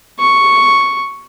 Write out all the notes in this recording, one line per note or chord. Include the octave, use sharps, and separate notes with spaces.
C#6